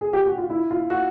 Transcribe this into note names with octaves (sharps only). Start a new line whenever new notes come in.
G#4
G4
F#4
F4
E4
F4
F#4